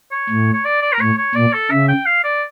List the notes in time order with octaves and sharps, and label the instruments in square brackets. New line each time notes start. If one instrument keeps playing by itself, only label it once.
[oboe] C#5
[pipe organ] A2
[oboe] C#5
D5
D5
A#4
[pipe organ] A2 [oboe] C#5
[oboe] C#5
[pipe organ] A#2 [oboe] D5
[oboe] A4
[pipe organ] C#3 [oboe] E5
[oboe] G5
F5
D5